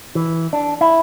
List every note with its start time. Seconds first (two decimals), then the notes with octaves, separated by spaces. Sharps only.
0.15 E3
0.53 D4
0.81 E4